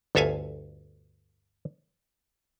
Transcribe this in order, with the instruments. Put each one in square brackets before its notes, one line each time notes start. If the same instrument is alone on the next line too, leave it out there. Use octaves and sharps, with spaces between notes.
[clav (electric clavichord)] G1 D2 A4 E5 F5 G#5